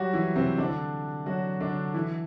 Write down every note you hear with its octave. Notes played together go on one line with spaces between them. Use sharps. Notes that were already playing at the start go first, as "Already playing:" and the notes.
Already playing: F#3 G3 F#4 G4
E3 E4
C3 C4
D3 D4
F#3 F#4
D3 D4
E3 E4